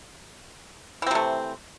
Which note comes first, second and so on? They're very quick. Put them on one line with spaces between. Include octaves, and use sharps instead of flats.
E3 C4 C3 A3